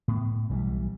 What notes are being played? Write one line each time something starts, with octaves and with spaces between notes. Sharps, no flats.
A2 B3
B1 E3 F#3 G3